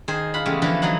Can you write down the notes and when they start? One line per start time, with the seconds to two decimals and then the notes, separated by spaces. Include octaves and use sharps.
0.08 D#3 G#4 C5
0.34 F4 F#5 B5
0.46 E2 C#3 G#3 A3 G4
0.62 D3 E3 F3 B3 A4 B4
0.82 E3 F#3 D#4 F#5